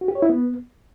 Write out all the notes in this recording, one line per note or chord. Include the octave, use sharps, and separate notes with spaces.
F#4
G4
C#5
E4
B3